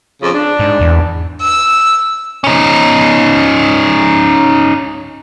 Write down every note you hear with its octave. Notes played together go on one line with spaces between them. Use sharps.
F2 C#3
D4
G#2
E2
E6
C#4 D#4